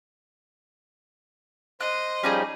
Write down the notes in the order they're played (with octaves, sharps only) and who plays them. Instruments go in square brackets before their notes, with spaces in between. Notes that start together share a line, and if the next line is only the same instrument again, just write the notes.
[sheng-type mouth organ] C5 [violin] D#5 [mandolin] F#6
[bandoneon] F3 G3 G4 [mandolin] C#4 D#4 G#4